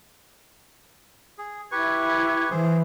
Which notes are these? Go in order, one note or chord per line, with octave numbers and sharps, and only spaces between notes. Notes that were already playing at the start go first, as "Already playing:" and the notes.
G#4
E4 G4 B4 C#6 G#6
E3 G#4 C5